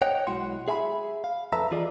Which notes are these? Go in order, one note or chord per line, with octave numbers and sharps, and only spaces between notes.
C#5 D#5 F#5 G5
B1 G#3 E4 F#4 F#5 C6
G#4 E5 G#5 A#5 B5
F5
F2 A4 B4 E5 A#5
E3 F4 G#4 D5 D#5